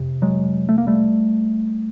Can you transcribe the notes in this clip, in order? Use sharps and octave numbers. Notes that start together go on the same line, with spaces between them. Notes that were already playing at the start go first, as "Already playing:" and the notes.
Already playing: F2 C3
F#3 G#3
A3
A#3
G3 A3